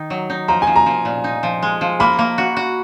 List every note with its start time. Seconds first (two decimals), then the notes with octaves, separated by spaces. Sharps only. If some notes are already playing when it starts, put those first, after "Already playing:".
Already playing: D#3 D#4
0.10 F#3
0.30 D#4
0.48 F3 A#5
0.62 G#5
0.67 F3
0.76 A#5
0.86 F3
1.05 A#2
1.24 D#4
1.43 F3
1.63 G#3
1.81 F3
2.00 A#3 B5
2.19 A#3
2.38 F#4
2.57 F#4